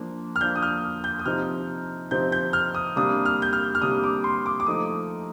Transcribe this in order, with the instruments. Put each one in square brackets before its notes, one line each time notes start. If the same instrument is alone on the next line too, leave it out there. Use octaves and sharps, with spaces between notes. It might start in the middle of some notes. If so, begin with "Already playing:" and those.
Already playing: [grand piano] F3 A#3 D4
F6
F3 A#3 D4 G6
D#6
F6
G6
D#6
C3 F3 C4 D#4 F6
C3 F3 C4 D#4 G6
G6
F6
D#6
C3 G3 A#3 D4 D#6
F6
G6
F6
F6
C3 G3 A#3 D4 D#6
D6
C6
D6
D6
F3 A3 D#4 D#6